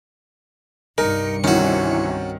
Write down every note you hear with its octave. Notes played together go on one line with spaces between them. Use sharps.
C2 G2 D#4 A#4 C#7
G#1 D#3 E3 C4 C#4 F#4